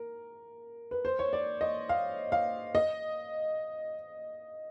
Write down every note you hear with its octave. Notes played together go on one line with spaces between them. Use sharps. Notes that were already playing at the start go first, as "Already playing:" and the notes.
Already playing: A#4
B4
C5
C#5
D5
D#5
F5
F5
D#5